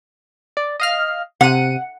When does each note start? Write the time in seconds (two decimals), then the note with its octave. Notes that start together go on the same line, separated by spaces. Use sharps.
0.57 D5
0.80 D#5 F5 F6
1.41 C3 F#5 D#7